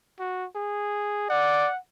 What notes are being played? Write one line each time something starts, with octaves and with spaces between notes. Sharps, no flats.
F#4
G#4
D5 F#5